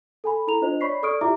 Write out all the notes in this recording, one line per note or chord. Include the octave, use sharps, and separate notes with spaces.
A4 G#5 B5
E4 A4 A#5 F7
D4 F4 C5 D#5
C#5 D5 B5 C#6 B6 C7
A4 D5 C#6 D#6 F6 D7
E4 F4 G4 E5 A#5 D6